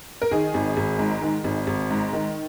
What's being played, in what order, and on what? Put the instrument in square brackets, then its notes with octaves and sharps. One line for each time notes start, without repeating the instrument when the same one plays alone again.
[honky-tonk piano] A#4
D#3 G#4
G#1
G#1
G#2
D#3
G#1
G#1
G#2
D#3